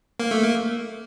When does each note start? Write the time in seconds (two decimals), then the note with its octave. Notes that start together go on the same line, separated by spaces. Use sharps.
0.20 A#3
0.31 A3
0.42 A#3